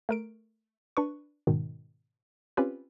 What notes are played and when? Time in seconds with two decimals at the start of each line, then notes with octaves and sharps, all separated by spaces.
0.09 A3 A#4 D7
0.97 D4 B4 C#6
1.47 G#2 B2 D#3
2.57 C4 C#4 F4 G4 B4